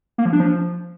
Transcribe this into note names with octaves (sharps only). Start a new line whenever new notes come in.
A#3
F3
D4
F3